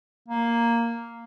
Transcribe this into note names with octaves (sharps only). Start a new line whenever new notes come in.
A#3